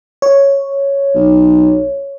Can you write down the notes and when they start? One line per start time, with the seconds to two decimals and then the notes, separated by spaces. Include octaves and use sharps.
0.22 C#5
1.15 B1